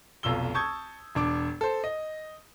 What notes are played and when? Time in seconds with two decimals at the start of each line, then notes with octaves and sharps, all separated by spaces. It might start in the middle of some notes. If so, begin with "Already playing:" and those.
0.23 F1 B1 F4 E6 G7
0.54 A5 C#6 D#6 G6 G#6
1.15 E1 D4 D6
1.61 A4 C5
1.84 D#5